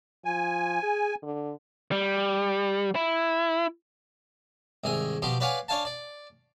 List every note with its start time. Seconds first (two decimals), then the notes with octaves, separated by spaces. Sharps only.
0.25 F3 G#5
0.83 G#4
1.23 D3
1.92 G3
2.95 E4
4.84 C2 G#2 D#3 G#5
5.22 B2 F3 G4 C6
5.40 B4 C#5 D5 F5 F#5 G#5
5.68 D4 C#5 F5 G#5 A5
5.85 D5